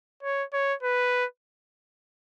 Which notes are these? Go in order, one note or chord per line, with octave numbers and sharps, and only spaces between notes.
C#5
C#5
B4